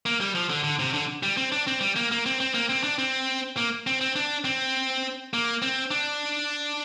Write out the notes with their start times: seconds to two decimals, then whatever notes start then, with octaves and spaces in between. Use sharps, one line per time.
0.06 A#3
0.21 G3
0.35 F3
0.50 D3
0.64 D3
0.79 C3
0.94 D3
1.23 G3
1.37 C4
1.52 D4
1.67 C4
1.81 G3
1.96 A#3
2.11 A#3
2.26 C4
2.40 C4
2.54 A#3
2.69 C4
2.83 D4
2.99 C4
3.57 A#3
3.87 C4
4.01 C4
4.16 D4
4.45 C4
5.33 A#3
5.62 C4
5.91 D4